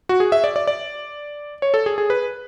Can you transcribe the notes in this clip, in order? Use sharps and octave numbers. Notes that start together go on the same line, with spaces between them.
F#4
G#4
E5
D5
D5
D5
C#5
A4
G#4
G#4
B4